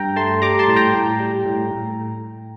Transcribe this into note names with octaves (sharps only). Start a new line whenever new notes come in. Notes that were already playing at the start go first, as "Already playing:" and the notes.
Already playing: G2 G5 A#5
A3 A5 C6
G3 A#5 D6
A5 C6
A2
G5 A#5
A2
G3
A2
A2